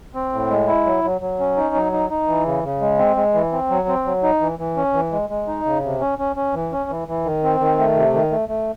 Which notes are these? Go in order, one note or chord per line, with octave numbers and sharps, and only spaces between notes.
C4
A2
G#3
E4
F#3
F#3
F#3
C#4
D#4
F#3
D#4
D#4
E3
C#3
C#3
G#3
C4
G#3
E3
C4
F#3
C4
F#3
D#4
E3
E3
C#4
E3
G#3
G#3
D#4
C#3
C3
C#4
C#4
C#4
E3
C#4
E3
E3
D#3
C4
D#3
A3
C3
D#3
A3
A3